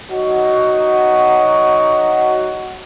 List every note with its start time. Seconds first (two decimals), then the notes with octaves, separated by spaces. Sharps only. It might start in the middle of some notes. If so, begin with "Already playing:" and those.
0.11 F#3 D#4 F#4